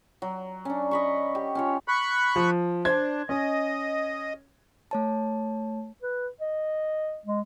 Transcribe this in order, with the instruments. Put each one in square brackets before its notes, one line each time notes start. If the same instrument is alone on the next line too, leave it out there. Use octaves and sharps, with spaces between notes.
[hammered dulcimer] F#3
C#4 D4
D#5 B5 C#6
G4
C#4 F4 C#5
[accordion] B5 C#6 F#6
[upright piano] F3
[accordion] D4 [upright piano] C5 G#6
[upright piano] C#4 [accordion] D#5
[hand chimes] A3 C#5 A5
[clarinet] B4
D#5
G#3